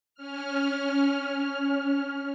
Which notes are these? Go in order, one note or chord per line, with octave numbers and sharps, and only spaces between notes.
C#4 F6